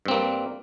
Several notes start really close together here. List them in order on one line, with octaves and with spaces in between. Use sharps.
G2 C4 A#3 G3